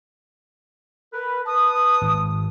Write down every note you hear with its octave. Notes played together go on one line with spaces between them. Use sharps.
A#4 B4
B4 A5 D#6
G#1